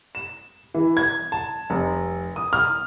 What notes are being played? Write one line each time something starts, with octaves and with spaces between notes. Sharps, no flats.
E7
E3
G#6
A5
F1
D#6
F6